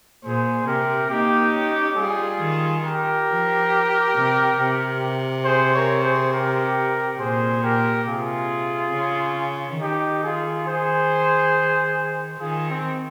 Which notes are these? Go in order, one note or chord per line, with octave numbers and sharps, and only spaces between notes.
A#2 G#4 C5
C3 G4 A#4
A#3 D#4 G4
C#4
G3 F4 G#4
D#3
G4 A#4
F3
C3
C3
G#4 C5
A#4 C#5
G#4 C5
G4 A#4
A#2 G#4 C5
G4 A#4
C3 F4 G#4
C#3
D#3 D#4 G4
F4 G#4
G#4 C5
D#3 F4 G#4
C4